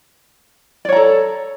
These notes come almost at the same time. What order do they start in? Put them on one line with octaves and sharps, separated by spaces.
D5 C#5 A#5 A4